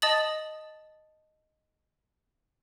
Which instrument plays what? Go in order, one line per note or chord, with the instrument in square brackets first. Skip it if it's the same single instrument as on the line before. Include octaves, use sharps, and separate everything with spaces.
[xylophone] D#5 A5 D#6 A6 F#7